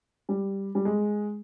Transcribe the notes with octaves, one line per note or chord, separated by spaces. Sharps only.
G3
G3
G#3